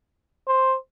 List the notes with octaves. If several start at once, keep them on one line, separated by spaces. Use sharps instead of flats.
C5